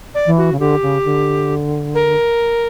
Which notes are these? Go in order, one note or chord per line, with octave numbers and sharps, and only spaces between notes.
D5
E3
F#4
C#3
D3 G4
C#3
D3
A#4